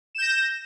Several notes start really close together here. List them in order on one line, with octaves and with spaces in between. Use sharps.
E7 G6 A#6